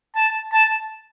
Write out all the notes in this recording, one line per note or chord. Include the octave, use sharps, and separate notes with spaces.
A5
A5